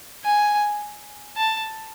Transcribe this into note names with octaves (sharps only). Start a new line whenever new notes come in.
G#5
A5